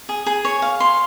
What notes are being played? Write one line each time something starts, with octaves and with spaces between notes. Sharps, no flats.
G#4
G#4
C#5
F5
C6